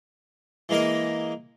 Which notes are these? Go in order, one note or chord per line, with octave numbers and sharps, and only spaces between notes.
E3 G#3 A#3 A#4 D#5